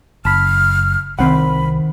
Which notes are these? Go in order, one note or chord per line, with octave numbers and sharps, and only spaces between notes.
F#1 A5 B5 F6
C2 D#3 C4 F#5 B5